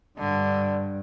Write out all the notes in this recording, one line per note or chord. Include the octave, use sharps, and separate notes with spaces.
G2 D3